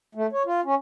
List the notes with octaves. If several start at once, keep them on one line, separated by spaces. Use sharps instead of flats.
A3
C#5
F4
C#4